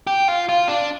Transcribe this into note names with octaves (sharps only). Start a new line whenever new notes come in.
G4
F4
F4
D4